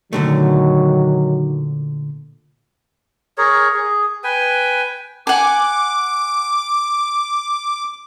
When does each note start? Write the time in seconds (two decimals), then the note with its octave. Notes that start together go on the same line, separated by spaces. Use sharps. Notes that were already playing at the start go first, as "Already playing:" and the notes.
0.13 A#2 D3 D#3 F#3 A3
3.38 G#4 A#4 C#5
3.75 G#4
4.24 B4 G5 G#5
5.27 F#5 G#5 D6